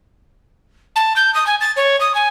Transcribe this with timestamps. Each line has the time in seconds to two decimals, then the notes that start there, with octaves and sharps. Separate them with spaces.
0.96 A5
1.16 G6
1.34 D#6
1.47 G#5
1.61 A6
1.76 C#5
2.01 D#6
2.15 G#5